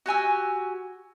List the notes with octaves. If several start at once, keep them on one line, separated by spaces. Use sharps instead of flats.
F#4 G4 G#5 E6